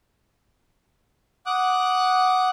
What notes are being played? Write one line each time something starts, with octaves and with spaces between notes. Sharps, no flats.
F#5 D6 D#6 F#6